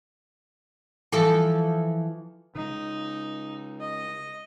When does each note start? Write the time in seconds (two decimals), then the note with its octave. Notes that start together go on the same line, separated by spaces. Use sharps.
1.12 E3 F3 A4
2.55 C#3 G#3 D#4
3.80 D#5